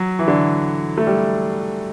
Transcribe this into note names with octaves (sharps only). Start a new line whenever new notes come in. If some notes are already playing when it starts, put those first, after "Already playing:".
Already playing: F#3
E3
D3
A3
G3